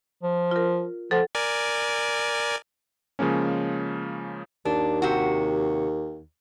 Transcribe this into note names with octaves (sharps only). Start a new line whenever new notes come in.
F3
F4 A#4
F3 A4 F#5
A#4 D5 G#5
C#3 F3 G#3 A#3 C#4
D#2 D4
C3 F#4